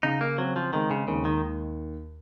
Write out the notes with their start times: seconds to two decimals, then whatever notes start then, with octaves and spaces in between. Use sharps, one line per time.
0.03 C#3 D#4
0.21 A#3
0.38 F#3 C4
0.56 F3
0.73 D#3 G#3
0.91 C#3
1.08 D#2 C#3
1.25 D#3